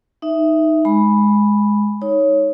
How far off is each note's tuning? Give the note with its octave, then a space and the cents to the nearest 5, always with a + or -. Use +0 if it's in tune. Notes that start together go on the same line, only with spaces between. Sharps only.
D#4 +0 E5 +0
G#3 +0 B5 -5
D#4 +15 C#5 +0